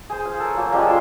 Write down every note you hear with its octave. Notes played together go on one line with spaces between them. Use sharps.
G#4 C5
F5
A4 A#4 C#5
F#3 A#3
F3 G3 G#3 C#4
A4 A#4 C#5 C6